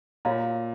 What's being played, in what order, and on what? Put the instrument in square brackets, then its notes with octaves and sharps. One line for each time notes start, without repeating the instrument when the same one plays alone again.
[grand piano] A#2 [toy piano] F#4 C#5 F5 A#5